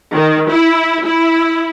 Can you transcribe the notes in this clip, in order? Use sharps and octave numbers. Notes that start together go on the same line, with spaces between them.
D#3
E4
E4